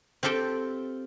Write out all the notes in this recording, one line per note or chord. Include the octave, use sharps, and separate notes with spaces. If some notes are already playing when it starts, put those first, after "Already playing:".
C4 F4 G4 A4 G5